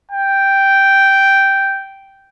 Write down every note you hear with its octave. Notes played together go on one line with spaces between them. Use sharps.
G5